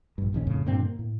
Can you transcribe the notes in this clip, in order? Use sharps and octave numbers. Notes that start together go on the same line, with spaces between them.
A#1 G2
E1 A#1 D#3 C#4
F2 A2 C#3
G2 A#2 D3 C4
A#3
A2